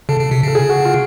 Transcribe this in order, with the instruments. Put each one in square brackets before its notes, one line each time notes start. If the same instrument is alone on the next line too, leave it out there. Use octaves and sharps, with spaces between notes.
[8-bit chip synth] C#3 [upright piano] A4
[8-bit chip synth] C#3
C3
[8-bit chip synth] C#3 [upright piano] A4
[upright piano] G#4
F#4
F4